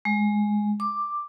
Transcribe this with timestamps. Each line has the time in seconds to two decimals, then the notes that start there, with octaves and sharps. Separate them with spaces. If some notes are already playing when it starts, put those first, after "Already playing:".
0.05 G#3
0.80 D6